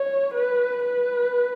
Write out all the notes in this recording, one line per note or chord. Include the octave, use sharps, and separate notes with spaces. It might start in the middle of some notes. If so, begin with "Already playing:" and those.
Already playing: C#5
B4
B4